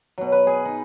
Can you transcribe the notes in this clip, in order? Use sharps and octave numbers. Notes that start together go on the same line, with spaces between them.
B2 F#3
B4
G#4
D#4